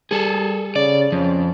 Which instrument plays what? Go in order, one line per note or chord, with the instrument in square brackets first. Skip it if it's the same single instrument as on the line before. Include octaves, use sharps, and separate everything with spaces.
[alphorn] G3 [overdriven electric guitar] G#4 A4
[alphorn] C#3 [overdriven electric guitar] D5
[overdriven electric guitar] F2 [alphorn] C#4